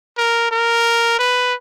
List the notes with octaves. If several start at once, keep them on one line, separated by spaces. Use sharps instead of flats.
A#4
A#4
B4